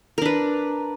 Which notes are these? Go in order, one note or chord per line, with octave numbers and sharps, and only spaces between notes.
D4 A#4 B4